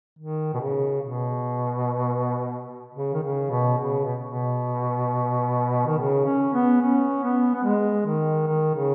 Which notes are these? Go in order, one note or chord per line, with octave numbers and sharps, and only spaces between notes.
D#3
B2
C#3
B2
C#3
D#3
C#3
B2
C#3
B2
B2
D#3
C#3
C#4
B3
C#4
B3
B3
G#3
D#3
D#3
C#3